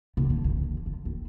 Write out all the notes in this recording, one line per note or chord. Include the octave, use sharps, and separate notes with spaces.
C3
D3
E3
E3
D3
F3
C4